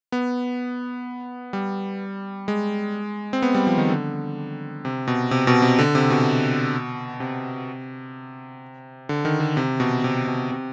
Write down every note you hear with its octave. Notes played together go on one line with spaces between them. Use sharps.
B3
G3
G#3
C4
B3
G3
F3
D#3
D3
C3
B2
C3
B2
C3
D3
C3
B2
C3
D3
D#3
D3
C3
B2
C3
B2
C3